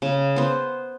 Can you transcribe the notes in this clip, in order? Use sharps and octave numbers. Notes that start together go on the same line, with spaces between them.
C#3
B3 C5